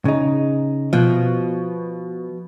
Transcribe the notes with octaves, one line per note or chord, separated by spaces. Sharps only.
C#3 D#4
B2 F3